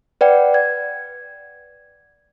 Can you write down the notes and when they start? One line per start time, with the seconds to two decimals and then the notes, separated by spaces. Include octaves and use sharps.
0.21 B4 D5 F#5 G5
0.54 G#6